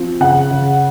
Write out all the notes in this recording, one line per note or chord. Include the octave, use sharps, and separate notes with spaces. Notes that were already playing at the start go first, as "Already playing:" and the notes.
Already playing: F3 C4
C#3 F#5
C#3